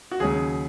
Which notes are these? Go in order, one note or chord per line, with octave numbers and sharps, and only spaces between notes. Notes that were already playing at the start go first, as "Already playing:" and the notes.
F#4
D#2 C#3 F#3 G#4